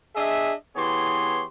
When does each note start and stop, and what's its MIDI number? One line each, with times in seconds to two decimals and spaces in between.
0.15 0.52 62
0.15 0.52 68
0.15 0.52 75
0.15 0.52 76
0.76 1.44 52
0.76 1.44 59
0.76 1.44 67
0.76 1.44 68
0.76 1.44 73
0.76 1.44 84